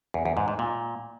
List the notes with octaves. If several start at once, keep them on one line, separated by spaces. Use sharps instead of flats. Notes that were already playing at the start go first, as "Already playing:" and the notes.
E2
E2
G#2
G#2
A#2